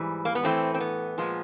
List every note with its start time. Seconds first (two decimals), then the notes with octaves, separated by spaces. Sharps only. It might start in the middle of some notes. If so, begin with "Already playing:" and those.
Already playing: G#2 E3 G3
0.25 A#3
0.35 B3
0.44 A2 E3 A3 C4
0.74 C4
0.80 B3
1.18 A#2 F3 G#3